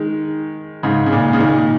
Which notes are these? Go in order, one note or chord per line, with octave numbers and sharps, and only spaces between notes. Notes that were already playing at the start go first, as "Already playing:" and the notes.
Already playing: D#3 G#3
G#2 C#3
C#3
A#2
C#3
A#2 D#3